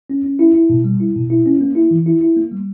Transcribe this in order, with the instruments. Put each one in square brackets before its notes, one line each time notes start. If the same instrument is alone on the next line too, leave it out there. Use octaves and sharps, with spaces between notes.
[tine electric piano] C#4
C#4
E4
E4
B2
G3
E4
B2
E4
C#4
A#3
E4
E3
E4
E4
A#3
G3